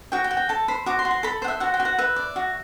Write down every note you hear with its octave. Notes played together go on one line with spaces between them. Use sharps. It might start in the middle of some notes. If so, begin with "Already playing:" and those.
F#4 G5
G5
F#4
G5
A4 A5
C5 B5
F#4 D6
C6
F#4
C6
A4 B5
C5 F#5
E5
F#4 F#5
G5
F#4
F#5
B4 E5
D5
F#4